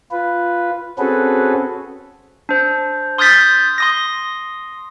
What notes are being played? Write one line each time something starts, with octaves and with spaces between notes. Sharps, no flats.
F4 B4
C4 C#4 F#4 G#4 A4 B4
D4 C5
C6 D#6 F6 G6 A6 B6
C6 D#6 A#6